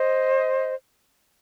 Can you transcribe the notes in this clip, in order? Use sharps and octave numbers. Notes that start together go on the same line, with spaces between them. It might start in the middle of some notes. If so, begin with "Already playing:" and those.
Already playing: C5 D#5